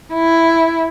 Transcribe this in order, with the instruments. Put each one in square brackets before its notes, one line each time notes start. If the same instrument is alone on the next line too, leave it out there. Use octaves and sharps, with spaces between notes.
[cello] E4